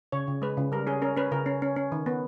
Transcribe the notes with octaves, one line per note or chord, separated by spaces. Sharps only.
C#3 C#5
C#3
G#3 B4
C#3
G3 A#4
C#4 G#4
C#4 A#4
C#4 B4
C#3 A#4
C#4
C#4
C#4
D#3
B3